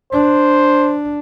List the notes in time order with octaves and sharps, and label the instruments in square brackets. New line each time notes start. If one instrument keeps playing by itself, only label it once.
[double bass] D4 [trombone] C5